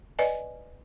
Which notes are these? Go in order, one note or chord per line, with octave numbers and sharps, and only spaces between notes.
B4 D5 D#5 G#5